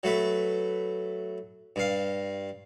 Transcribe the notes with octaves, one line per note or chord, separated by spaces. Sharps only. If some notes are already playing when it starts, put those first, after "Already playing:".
F#3 A3 B4
G2 F5